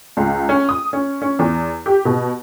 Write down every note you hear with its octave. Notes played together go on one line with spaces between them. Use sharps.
C#2
C#4
D#6
C#4
C#4
E2
G4
B2